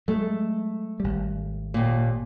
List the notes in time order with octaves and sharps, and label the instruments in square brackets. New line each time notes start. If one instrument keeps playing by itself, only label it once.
[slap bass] F#3 G#3 [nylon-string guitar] A3
[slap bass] G#1 G3
[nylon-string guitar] D#2 A#2